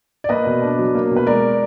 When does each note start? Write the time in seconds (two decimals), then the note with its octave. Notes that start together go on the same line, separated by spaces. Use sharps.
0.24 D5
0.29 A#3 B4 D#5
0.46 B2
0.62 D4
0.79 F#3
0.95 A#3
1.11 B2
1.16 B4
1.26 G#3 A#4 D5